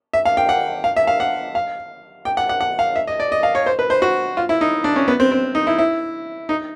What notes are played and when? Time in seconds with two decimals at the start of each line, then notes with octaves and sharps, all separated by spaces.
0.13 E5
0.25 F5
0.37 G5
0.49 F#5
0.84 F5
0.96 E5
1.07 F5
1.20 F#5
1.55 F5
2.25 G5
2.37 F#5
2.49 F#5
2.61 F#5
2.79 F5
2.96 E5
3.07 D#5
3.20 D5
3.32 D#5
3.43 F5
3.55 C#5
3.66 C5
3.79 B4
3.90 C5
4.02 F#4
4.37 F4
4.49 E4
4.61 D#4
4.84 D4
4.96 C#4
5.08 B3
5.20 C4
5.32 C4
5.55 D#4
5.67 E4
5.78 E4
6.49 D#4